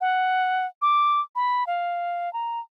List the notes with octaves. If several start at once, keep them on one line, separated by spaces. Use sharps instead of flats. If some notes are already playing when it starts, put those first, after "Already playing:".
F#5
D6
B5
F5
A#5